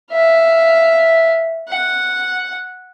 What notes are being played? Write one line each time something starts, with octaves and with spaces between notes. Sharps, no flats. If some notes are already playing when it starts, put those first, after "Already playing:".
E5 F5
F#5